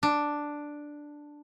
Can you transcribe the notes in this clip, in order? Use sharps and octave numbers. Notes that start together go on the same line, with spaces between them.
D4